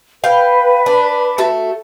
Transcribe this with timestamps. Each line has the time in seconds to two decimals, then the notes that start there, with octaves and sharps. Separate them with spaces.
0.24 B4 F5 G5
0.86 D4
1.38 A3 F#4 A4